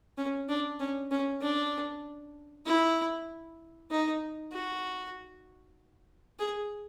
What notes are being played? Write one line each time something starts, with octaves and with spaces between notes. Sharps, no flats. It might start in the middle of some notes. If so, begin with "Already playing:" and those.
C#4
D4
C#4
C#4
D4
E4
D#4
F#4
G#4